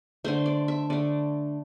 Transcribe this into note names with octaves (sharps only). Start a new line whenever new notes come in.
D3 A3 C5
D5
E5
D3 A3 D5